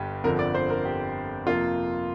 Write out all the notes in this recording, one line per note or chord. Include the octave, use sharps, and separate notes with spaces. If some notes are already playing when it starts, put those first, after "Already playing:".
Already playing: G1 G2 G4
G1 F2 D3 F3 C4 A#4
D5
C5
A#4
G4
F2 C3 A#3 F4